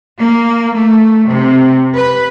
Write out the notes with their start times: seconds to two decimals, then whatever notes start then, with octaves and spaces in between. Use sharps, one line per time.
0.19 A#3
0.74 A3
1.28 C3
1.96 B4